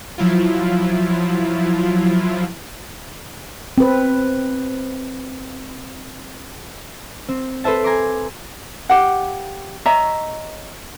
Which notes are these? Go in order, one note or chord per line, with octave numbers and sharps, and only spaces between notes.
F3 F#3 E4 F4
C4 B4
C4
A4 B4 C5 E5 A5
G#5 A#5 C6 D6
G4 F5 F#5
C#5 D#5 E5 A#5